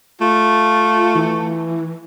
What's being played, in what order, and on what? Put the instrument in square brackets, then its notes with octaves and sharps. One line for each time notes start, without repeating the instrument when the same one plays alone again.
[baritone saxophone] A3 [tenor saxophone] F4
[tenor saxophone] E3